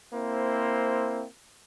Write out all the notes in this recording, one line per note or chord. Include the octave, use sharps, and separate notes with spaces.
A#3 C4 E4 C5